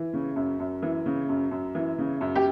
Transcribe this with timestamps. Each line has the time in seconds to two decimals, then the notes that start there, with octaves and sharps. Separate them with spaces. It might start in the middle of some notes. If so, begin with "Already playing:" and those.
Already playing: E3
0.13 C#3
0.36 F#2
0.60 F#2
0.83 E3
1.06 C#3
1.29 F#2
1.51 F#2
1.75 E3
1.99 C#3
2.21 F#2
2.36 G4